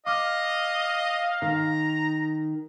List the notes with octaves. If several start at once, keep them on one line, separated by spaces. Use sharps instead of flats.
D#5 F5 D6 F6
D#3 A#5